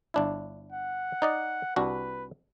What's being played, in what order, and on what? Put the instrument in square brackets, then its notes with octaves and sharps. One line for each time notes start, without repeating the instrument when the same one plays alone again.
[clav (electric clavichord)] G1 D4 E4
[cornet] F#5
[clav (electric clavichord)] D#4 D5 D#5
[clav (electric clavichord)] C2 D4 F#4 [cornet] B4